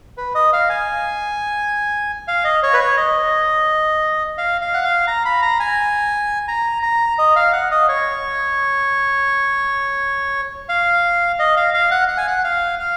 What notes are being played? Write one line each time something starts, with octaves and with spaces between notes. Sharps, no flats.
B4
D#5
F5
G#5
F5
D#5
C#5
B4
C#5
D#5
F5
F5
F#5
F5
A#5
B5
A#5
G#5
A#5
A#5
D#5
F5
F#5
D#5
C#5
F5
D#5
F5
F5
F#5
F#5
G#5
F#5
F5
F5